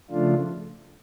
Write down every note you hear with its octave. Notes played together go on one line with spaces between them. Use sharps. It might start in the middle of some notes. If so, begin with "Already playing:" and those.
C#3 F3 A3 D4 F4